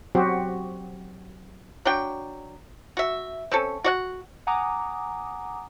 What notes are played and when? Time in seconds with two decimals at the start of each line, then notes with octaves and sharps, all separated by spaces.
0.15 F#3 C4 F#4 G4 C5
1.85 F#3 D4 G5
2.97 F#4 E5
3.51 C4 C#4 A4
3.84 F#4 D5 F#5
4.47 F#5 G#5 A#5 D6 D#6